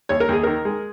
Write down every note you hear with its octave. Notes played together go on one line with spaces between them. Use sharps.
D#2 C#5
A#4
D#2 G#4
D#3 A#4
G#3